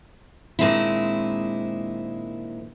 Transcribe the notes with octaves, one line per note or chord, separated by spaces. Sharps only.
A#2 D#3 G#3 C4 D4 E4